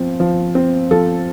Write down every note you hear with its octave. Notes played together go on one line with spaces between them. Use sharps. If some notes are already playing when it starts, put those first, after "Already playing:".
Already playing: F3 C4
F3
C4
F3 A4